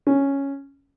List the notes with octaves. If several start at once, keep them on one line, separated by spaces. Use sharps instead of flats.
C#4